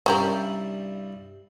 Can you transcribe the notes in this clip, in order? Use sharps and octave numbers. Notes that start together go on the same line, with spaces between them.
C2 G2 C#4 E4 G4 A#4